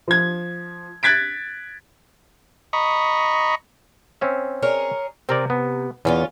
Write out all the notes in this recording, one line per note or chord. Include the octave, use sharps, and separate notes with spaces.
F3 G#6
F#6 G#6 A6 B6 D7
D#5 A#5 B5 C#6
C4 C#4 E5
G#4 A#4 C#5
C3 C4 A#4 D5
B3
E2 C#4 E4 F4